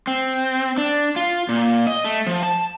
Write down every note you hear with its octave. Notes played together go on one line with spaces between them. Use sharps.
C4
D4
F4
A#2
D#5
A3
F3
A5